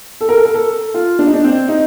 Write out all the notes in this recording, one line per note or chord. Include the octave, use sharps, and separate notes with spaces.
A4
A#4
A4
A#4
A4
F4
D4
D#4
D4
C4
D#4